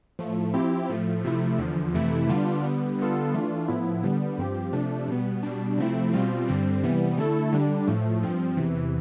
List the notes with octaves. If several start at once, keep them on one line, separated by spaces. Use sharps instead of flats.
A2 F3 A3
F3 C4 E4 G4
A2 F3 A3
C3 F3 A3 E4
E2 D3 F3
F2 C3 E3 A3 E4
D3 G3 B3 D4 F4
D3 G3 B3
D3 G3 B3 F4 A4
E3 A3 D4 F4
A2 F3 B3 E4
D3 G3 B3
G2 F3 C4 G4
C3 F3 A3 D4
B2 G3 B3
B2 G3 D4
C3 F3 A3 C4 E4
B2 G3 C4 F4
G2 D3 G3 C4
C3 E3 G3 B3
D3 A3 E4 A4
D3 G3 D4
A2 F3 A3
G2 F3 C4
E2 C3 E3